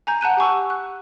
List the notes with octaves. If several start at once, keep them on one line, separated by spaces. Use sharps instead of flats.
G#5 A#5 G6
F#5 A5 F#6 D#7
G4 G#5 C#6 E6
F#6